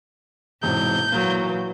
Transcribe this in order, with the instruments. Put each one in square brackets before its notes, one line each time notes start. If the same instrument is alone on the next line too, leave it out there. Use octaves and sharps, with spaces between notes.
[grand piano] E1 E2 C3 [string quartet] G#2 [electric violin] G6
[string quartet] A#2 E3 F#3 [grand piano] A#3